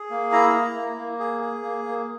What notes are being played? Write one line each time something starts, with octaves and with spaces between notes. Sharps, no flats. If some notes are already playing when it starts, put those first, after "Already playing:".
Already playing: G#4
A#3
E4 A#5
E4
A#3
A#3
G#4
G#4
A#3
A#3